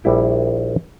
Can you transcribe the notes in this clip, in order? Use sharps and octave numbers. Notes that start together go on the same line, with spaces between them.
A#1 G3 E4 G5